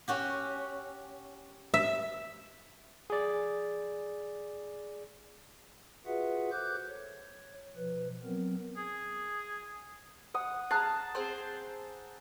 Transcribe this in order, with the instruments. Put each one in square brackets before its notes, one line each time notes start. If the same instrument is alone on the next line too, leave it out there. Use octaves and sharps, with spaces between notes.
[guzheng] C#4 F#4 G4
[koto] E5
[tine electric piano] G#4 D5
[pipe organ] F4 F#4 G#4 B4 E5 F#5
A4 C5 D6 F#6 G6
C#5
B2 F3 B4
F#3 B3 C4 A#4
[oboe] G#4
[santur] F#5 D#6
[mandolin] G#4 F6 F#6 [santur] A5 A#5
[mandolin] C4 G#4 C5